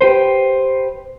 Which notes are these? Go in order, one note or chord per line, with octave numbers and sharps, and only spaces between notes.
G4 B4 C5